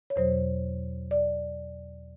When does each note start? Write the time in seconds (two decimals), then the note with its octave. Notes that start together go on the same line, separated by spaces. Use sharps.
0.10 C#5
0.16 E2 B2 F#3 C5
1.11 D5